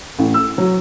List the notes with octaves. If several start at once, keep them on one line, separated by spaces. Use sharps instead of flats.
A1
E6
F#3